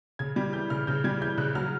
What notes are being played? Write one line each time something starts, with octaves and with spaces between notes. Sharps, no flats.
C#3 G#6
G3
E3 G6
C#3 F6
C#3 G6
G3 G#6
E3 G6
C#3 F#6
F#3 F6